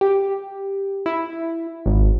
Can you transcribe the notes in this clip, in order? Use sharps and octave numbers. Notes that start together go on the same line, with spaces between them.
G4
E4
G#1